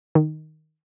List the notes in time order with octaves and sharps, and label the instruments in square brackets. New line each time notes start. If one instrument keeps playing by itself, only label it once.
[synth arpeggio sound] D#3